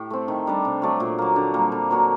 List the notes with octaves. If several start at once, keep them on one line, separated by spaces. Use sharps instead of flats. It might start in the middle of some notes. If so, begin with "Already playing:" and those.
Already playing: A2 G4
A3 C4
D#3
G3 D4
C3
F#3 A3 D4
A#2
F#3 A#3
D3
G3 A#3
D3
F#3 A#3 F#4